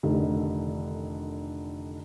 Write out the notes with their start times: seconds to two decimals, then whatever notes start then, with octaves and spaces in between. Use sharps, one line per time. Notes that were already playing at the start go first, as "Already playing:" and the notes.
0.03 F1 D3 D#3